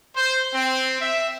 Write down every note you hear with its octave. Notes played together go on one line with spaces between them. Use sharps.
C5
C4
E5